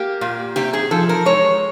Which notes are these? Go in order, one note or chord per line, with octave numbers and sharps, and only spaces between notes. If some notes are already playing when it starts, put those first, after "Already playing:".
Already playing: A#3 G4
A#2
C3 G4
G#4
F3 A4
A#4
G#3 C#5